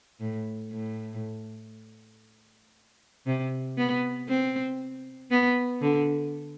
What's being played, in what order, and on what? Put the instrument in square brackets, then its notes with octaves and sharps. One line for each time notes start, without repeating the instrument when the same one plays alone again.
[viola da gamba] A2
A2
C3
B3
C4
B3
D3